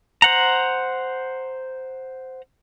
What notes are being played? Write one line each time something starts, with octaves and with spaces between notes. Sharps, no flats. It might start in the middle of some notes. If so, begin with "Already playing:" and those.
C5 F#5 A#5